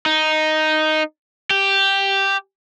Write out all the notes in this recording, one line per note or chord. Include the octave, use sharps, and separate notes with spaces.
D#4
G4